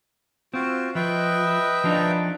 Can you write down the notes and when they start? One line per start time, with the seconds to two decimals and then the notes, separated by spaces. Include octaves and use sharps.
0.54 C4 F4 F#4
0.95 F3 B4 D#5 E5 G5
1.84 F3 D4 D#4